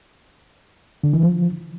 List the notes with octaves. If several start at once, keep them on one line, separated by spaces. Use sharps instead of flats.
D3
E3
F3